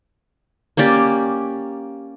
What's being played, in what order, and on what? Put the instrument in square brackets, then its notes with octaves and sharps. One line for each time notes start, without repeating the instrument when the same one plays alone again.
[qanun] A#3 C#4 G4 D5